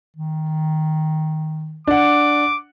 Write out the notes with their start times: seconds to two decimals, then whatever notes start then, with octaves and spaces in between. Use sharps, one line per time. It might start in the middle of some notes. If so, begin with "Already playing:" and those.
0.16 D#3
1.87 D4 F#5 D6